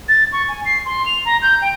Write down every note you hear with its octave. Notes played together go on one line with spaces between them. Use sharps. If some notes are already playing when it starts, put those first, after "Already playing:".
A6
C#6
G#5
C7
C6
F7
A#5
G6
G5